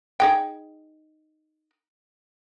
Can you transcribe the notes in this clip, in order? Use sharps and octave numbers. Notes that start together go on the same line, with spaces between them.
D#4 G#4 G5